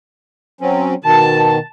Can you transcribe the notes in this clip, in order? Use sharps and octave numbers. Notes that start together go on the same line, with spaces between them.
F#3 C4 C#4
B2 D#3 A5